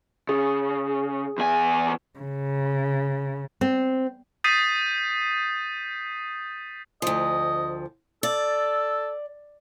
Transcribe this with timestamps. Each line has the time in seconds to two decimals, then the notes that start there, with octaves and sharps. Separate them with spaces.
0.29 C#3 G#4
1.38 E2 G#5
2.19 C#3
3.61 C4
4.44 D#6 G6 A6 B6 C7 D#7
7.02 D2 F3 D#5
8.23 A4 D5